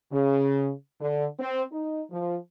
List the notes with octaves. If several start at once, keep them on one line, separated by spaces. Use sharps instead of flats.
C#3
D3
C4
D#4
F3